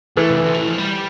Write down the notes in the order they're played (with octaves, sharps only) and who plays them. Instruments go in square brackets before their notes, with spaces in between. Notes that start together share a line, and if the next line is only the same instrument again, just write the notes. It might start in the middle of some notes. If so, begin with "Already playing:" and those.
[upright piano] E3 [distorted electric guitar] A3
[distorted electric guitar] C3
D3
E3
F3
G3